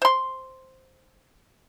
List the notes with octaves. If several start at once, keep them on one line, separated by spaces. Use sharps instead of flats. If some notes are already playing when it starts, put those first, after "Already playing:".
C5 C6